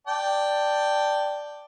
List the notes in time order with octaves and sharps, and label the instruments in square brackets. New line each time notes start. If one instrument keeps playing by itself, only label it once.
[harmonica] D5 G5 A5